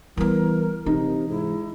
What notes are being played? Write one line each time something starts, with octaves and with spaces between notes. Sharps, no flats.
E3 G3 B3 A#4
C3 E3 D#4
G#2 E4